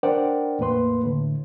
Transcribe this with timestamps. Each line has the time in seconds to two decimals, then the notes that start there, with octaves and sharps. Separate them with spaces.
0.03 D4 A#4 C5 D5 F#5 G5
0.59 E2 A2 A#3 B4 C6
1.04 A2 D3